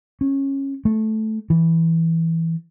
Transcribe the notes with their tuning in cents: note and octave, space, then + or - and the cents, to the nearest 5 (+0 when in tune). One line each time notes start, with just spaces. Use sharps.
C#4 -15
A3 -10
E3 -5